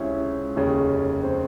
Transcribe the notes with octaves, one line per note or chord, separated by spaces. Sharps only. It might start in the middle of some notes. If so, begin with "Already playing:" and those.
Already playing: C#2 C3 C#4 E4
F1 D#2 C#3
C4